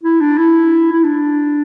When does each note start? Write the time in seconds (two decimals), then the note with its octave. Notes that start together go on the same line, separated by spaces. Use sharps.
0.04 E4
0.21 D4
0.38 E4
0.92 E4
1.04 D4